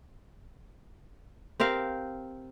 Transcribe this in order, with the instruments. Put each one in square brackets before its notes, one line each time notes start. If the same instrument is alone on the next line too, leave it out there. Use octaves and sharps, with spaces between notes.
[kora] C4 G4 A#4 F5